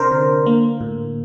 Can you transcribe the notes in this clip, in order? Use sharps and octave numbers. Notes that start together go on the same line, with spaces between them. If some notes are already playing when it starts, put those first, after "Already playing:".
Already playing: C3 D4 A#4 C5
D3
A#3
A2